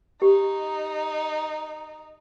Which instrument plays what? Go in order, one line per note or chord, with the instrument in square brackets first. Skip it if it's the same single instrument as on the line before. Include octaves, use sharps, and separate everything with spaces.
[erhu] D#4 [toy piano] G4